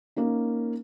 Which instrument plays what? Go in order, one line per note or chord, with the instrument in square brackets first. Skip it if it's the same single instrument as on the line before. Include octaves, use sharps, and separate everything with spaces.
[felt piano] A#3 C#4 D#4